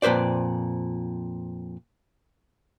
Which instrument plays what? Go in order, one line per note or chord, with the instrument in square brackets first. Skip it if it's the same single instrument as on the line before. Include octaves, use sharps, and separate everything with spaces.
[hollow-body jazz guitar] F2 A#2 B4 C5 D5